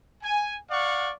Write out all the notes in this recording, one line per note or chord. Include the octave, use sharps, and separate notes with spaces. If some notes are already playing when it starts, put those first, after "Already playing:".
G#5
D5 F5 F#5 C#6